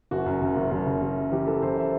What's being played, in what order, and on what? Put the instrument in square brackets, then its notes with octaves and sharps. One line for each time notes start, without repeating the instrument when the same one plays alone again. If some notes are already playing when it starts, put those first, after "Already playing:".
[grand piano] F#1 F#4
F#2
F#1
F#1
F#1
F#1
F#1
F#1
E3 G4
E3 A4
F#1 C5
E5